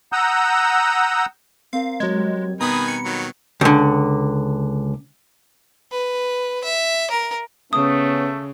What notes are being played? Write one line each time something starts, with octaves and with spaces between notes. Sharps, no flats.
F#5 A#5 D#6 E6 G6
C4 A#4 F5
F#3 G#3 D#5 G#6
G3
B2 D#3 B4 G#5 A#5 B5 D#6
C#7
D#3 F#3
C#2 D3
B4
E5
A#4
C#3 A3 B3 C#4 D#6